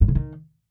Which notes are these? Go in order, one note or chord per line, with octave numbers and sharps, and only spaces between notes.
G2
C#3
D#3